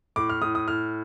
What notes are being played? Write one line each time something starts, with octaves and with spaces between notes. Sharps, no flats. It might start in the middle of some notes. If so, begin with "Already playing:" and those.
A2 D6
F6
A2 D#6
D#6
A2 F6